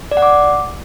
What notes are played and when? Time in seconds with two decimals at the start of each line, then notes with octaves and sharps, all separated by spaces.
0.11 D5
0.17 F#5
0.22 D6